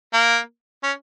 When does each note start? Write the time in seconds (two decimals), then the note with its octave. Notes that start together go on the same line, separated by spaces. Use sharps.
0.14 A#3
0.83 C#4